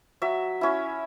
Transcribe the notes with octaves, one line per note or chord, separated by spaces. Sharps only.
F#3 E5
C#4 E4